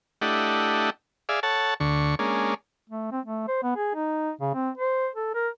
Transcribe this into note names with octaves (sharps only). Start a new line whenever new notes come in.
A3 D4 E4 G4 D#5 F#5
G#4 D5 E5 F5
A4 C#5 F#5 A5
D2 D3 C#6
G#3 A#3 C#4 D4
A3
C4
A3
C5
B3
G#4
D#4
C#3
C4
C5
A4
A#4